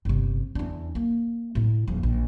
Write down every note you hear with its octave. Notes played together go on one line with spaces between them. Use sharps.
G1 C3
E2 D4
A#3
A2 E4
D#1 F3
A#1